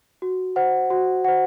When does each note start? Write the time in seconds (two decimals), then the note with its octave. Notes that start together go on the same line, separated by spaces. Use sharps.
0.22 F#4
0.56 C5 F#5
0.90 F#4
1.25 C5 F#5